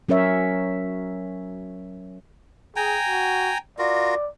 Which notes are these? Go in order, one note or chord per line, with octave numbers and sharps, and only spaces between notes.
F#3 C#4 A#4 C#5 E5
G#4 G5 G#5 A#5
F#4
F4 F#4 A#4 D5